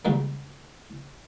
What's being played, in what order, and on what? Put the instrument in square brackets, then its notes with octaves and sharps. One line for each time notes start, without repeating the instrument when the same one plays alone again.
[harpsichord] C#2 G3 A#3